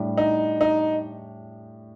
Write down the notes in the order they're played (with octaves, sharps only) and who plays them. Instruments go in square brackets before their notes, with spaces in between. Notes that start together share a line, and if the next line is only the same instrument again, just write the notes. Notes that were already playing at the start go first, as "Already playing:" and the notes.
Already playing: [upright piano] A2 G3 D4 G4
[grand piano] D#4
D#4